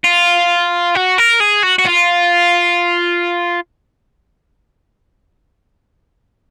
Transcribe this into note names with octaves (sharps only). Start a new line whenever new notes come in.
F4
F#4
A#4
G#4
F#4
F#4
F4